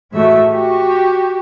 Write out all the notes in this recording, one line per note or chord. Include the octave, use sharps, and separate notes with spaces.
A2 E3 G#3 A3 F#4 E5
F#4 G4